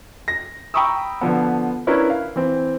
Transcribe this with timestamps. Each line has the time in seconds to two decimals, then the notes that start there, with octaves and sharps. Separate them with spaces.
0.28 A#6
0.74 G5 A#5 B5 C#6 D#6 E6
1.21 D3 F3 B3
1.87 C#4 D4 E4 A#4 B4 C#5
2.10 F5
2.36 E3 C4